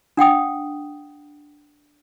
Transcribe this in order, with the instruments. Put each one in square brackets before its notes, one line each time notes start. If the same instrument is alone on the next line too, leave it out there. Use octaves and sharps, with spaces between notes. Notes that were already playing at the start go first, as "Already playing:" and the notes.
[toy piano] D4 F#5 G5 D#6